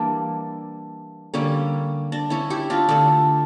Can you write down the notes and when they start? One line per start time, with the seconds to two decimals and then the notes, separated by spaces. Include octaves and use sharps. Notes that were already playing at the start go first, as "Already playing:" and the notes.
Already playing: E3 G3 A#3 D4 E4
1.34 D3 G3 A#3 C#4
2.12 D4
2.30 C#4 E4
2.50 E4 G4
2.70 D4 F4
2.89 D3 A3 D4